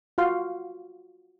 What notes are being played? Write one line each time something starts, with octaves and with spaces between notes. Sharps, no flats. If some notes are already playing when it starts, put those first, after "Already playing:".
F4 F#4 F5 C6